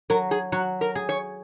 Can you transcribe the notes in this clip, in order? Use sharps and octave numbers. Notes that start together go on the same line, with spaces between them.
F#3 A#4
G#4
F#3 F#4
A#4
G#4
C#5